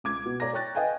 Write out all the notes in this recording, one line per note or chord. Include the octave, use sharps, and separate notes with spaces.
C#2 D6 G#6
B2
C#5 D5 A#5 A#6
C#5 G5 C#6 F#6 A6
B4 D#5 F5 G5 G#5